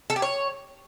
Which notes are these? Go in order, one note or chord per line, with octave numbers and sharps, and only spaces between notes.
A4
G4
C#5